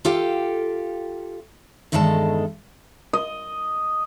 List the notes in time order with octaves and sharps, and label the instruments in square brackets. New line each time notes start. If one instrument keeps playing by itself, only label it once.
[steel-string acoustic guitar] F4 G4 A4 F5 G5
E2 G2 D#3 G#3 A4 A5
[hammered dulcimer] D#5